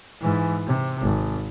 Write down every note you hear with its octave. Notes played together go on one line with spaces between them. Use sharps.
G#2 E3
C3
G#1